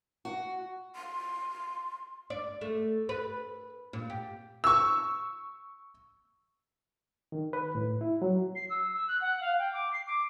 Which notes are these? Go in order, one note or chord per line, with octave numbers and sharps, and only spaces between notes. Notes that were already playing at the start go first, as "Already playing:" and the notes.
F#4
C6
D5
A3
B4
A#2
G4
C#6 E6
D#3
B4
A2
E4
F#3
C7
E6
E6
F#6
F#5
F5
G5
D6
C7
D6